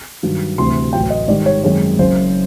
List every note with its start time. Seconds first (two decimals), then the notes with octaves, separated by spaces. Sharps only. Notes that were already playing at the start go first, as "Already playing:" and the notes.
0.23 G2 D#3 F#3
0.58 D2 C3 E3 C6
0.93 A1 A2 F#3 G5
1.10 D#5
1.28 G#2 D#3 G3 D5
1.46 C#5
1.63 F#2 D#3 G#3 C4 C#5
1.98 F#1 F#2 C#3 C5